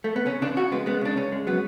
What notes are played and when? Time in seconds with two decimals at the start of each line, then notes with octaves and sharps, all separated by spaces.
0.04 A3
0.16 B3
0.26 C#3 C#4
0.42 C#3 D4
0.56 C#3 F#4
0.72 G#3 B3
0.86 G#3 B3
1.01 C#3 D4
1.17 C#3 C#4
1.32 G#3
1.47 F#3 B3